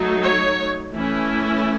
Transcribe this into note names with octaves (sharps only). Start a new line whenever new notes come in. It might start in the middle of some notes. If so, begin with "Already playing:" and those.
Already playing: F#3 A3 D#4
C#5
E3 A3 C#4 E4